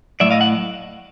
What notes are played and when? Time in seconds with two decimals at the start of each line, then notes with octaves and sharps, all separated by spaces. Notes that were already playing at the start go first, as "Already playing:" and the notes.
0.20 A2 F#3 D5 E5
0.31 D#5 F5
0.41 F#5